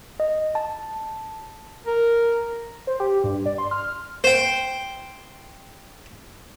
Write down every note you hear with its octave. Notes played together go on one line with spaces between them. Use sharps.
D#5
A5
A#4
C5
G4
G2
D5
C6
F6
C5 G5